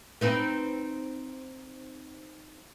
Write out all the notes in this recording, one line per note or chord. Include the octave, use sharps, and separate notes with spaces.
C4 D#4 B4